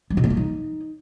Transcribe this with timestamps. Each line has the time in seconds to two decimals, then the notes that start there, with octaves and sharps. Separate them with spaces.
0.10 G3
0.17 B2
0.24 A3
0.30 A#3
0.37 D#4